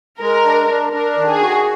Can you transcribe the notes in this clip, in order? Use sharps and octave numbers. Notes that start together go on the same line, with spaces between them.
G#3 A#4
D4
D4
D4 A#4
D#3
G#4
F#4